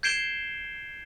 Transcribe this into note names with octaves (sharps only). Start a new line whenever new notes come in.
G6 G#6 C7 D7 E7 G7